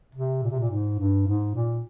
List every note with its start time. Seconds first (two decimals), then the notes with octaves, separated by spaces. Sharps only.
0.15 C3
0.43 A#2
0.50 C3
0.59 A#2
0.70 G#2
0.99 G2
1.27 G#2
1.55 A#2